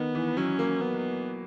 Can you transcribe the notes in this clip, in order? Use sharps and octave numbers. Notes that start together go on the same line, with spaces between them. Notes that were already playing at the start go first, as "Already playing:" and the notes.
Already playing: D#3 B3
E3
F#3 C#4
A#3
B3